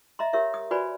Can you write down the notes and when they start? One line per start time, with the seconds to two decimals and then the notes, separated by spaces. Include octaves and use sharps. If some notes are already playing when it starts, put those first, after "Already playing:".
0.19 D#5 E5 A#5 C6
0.33 G4 A#4 C#5 E5
0.54 D#6
0.71 F#4 B4 C5 D5 G#5 B5